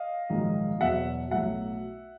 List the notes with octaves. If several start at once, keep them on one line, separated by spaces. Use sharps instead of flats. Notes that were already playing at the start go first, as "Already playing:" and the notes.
Already playing: D#5 F5
A#1 G#2 D#3 F#3
E2 B2 F#3 E5 F#5
B1 A2 F#3 E5 F#5